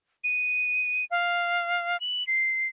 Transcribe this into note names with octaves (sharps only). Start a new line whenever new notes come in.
D#7
F5
F#7
C7